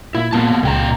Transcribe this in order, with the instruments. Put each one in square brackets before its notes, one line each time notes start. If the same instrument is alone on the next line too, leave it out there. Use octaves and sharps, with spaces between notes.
[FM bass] A#2 [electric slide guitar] E4
[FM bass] A#2 [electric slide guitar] A#3 B3 A5
[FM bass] C#2 [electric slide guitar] A#2 G5 A#5